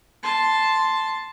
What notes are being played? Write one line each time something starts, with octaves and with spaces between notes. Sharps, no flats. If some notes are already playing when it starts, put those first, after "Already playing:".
A5 C6